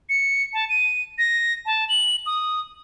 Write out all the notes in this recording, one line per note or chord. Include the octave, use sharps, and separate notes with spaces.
C#7
A5
D#7
A#6
A5
F#7
D#6